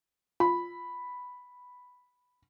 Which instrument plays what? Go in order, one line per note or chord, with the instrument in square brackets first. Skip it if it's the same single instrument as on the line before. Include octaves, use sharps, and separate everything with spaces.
[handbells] F4 [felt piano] B5